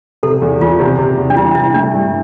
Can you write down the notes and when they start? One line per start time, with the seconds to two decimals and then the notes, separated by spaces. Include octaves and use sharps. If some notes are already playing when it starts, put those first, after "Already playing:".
0.23 C3 A4
0.42 E2
0.60 E2 F4
0.80 C3
0.99 C3
1.17 E2
1.30 D4
1.37 G3 E4
1.55 C3 E4
1.74 A3 D4
1.94 G2